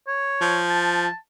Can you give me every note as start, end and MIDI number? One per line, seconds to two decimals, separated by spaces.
0.07 0.59 73
0.41 1.07 53
0.70 1.16 81